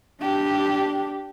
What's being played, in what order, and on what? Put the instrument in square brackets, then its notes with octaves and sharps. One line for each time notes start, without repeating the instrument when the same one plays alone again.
[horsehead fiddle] D4 G4